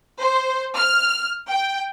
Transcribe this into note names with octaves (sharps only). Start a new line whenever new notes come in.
C5
F6
G5